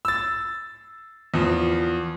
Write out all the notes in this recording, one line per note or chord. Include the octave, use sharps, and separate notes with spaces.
E6 A6
E2 F3